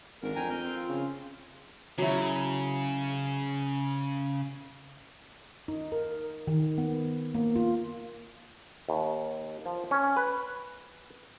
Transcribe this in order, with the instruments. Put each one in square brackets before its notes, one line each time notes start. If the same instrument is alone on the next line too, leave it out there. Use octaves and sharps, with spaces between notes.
[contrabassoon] G#1 [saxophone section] D2 D4 A#4
[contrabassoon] F2 [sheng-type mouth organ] G5 G#5 A#5
[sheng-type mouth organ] F6 G6
[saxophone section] C4
[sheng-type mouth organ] F4
[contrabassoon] C#3
[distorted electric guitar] C#3 [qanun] F#3 E4
[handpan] D#4
A#4
D#3
B3
A#3
F4
[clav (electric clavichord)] D#2
F3
C#4
B4